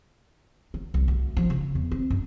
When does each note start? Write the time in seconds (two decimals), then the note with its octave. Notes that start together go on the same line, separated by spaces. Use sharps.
0.74 F#3
0.94 C2
1.08 D2
1.37 F3
1.50 C#3
1.75 E2
1.92 C4
2.10 F#2